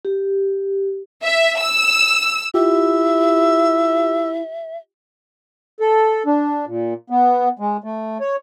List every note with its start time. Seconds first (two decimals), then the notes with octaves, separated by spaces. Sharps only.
0.05 G4
1.23 E5
1.59 E6
2.54 E4 F4 G4 E5 E6
5.80 A4
6.26 D4
6.67 A#2
7.10 B3
7.59 G#3
7.84 A3
8.21 C#5